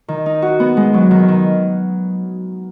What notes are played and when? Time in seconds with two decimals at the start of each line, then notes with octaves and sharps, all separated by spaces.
0.08 D#3
0.26 D#4
0.42 F#4
0.60 B3
0.77 G#3
0.94 F#3
1.11 D#3
1.28 D#3